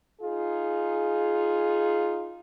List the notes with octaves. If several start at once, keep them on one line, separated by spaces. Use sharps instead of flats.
D#4 F4 G#4